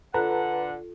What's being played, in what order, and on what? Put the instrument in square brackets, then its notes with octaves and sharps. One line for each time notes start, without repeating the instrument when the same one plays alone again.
[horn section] D3 F#5 [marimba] F4 A4 [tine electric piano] B4 A5 A#5